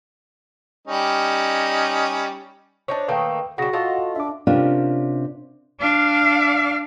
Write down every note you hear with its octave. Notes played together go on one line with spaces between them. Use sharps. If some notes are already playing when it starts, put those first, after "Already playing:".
G3 C#4 D#4
D4 D#4 C5 C#5
D#3 A3 A#3 B4 G5
C#3 G3 F#4 F#5 C#6 A#6
F4 A4 D#5
D4 E5 D6
C3 C#4 D4 F4 A#4
D4 F5